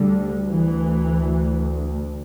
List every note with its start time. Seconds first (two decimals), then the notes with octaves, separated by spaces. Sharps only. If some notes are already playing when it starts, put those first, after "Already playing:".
Already playing: D2 D3 G3
0.48 E3